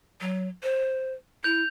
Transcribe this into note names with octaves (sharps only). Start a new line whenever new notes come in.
F#3
C5
E4 G6 F7